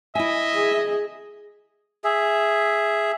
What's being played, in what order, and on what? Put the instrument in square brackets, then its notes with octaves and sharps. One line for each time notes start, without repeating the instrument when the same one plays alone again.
[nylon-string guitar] E4 G#5 [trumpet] D#5 [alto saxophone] E5
[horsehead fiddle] G#4
[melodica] G#4 E5